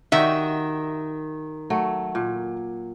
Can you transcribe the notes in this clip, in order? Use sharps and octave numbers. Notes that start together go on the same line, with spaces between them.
D#3 F#4 G4 E5
F#3 A3
A#2